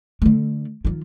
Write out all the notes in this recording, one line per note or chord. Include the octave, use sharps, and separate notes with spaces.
D3 A3
D#3 F3